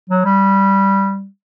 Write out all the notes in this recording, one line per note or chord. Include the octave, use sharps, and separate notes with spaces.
F#3
G3